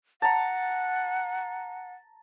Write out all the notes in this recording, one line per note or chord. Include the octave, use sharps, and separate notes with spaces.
F#5 A5 A#5